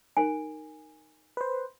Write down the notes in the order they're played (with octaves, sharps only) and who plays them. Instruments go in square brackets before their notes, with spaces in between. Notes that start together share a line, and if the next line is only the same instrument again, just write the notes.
[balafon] D#4 A#4 [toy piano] G#5
[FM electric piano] B4 C5